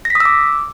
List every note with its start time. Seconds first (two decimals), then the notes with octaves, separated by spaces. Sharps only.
0.05 A#6
0.10 B6
0.15 D#6
0.20 E6
0.25 D6